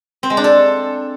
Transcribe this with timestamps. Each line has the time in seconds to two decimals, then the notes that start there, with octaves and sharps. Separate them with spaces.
0.23 C4
0.30 G#3
0.37 D4
0.44 A4